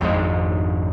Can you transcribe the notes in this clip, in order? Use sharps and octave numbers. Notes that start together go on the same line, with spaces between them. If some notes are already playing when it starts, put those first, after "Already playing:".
G#1 F2 G#2 G#3